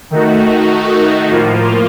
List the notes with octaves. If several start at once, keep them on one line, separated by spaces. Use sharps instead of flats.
D#3 A3 D#4 F#4
A2 F3 A#3 F4